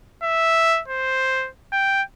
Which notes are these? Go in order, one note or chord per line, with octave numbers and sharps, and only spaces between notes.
E5
C5
G5